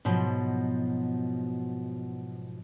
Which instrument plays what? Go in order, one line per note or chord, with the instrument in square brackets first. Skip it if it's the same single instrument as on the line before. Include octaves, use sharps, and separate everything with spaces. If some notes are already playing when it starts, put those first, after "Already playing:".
[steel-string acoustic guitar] G#2 B2 F3 F#3